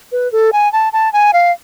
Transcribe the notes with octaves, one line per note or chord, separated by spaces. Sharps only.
B4
A4
G#5
A5
A5
G#5
F5